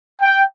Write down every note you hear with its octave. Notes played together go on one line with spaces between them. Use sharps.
G5